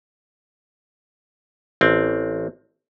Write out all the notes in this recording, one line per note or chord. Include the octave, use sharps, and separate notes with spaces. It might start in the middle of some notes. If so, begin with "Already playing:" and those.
A1 C4